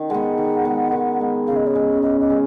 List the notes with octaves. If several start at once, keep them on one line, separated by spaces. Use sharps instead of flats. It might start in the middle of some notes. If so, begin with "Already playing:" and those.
Already playing: D#3
G#3 B3 F#5
D#3
G#3 B3
D#3
G#3 B3
C#3 F5
D#5
C#5
G#3 C#4 G#4 D#5
C#3 D#5
D#5
G#3 C#4